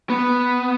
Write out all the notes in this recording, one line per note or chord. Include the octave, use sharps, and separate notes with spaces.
B3